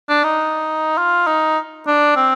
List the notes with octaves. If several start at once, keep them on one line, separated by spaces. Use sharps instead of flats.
D4
D#4
F4
D#4
D4
C4